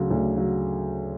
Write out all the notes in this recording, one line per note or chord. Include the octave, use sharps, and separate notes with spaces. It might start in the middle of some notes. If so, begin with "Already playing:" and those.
Already playing: D2 C#3 F#3
D2
C#3 F#3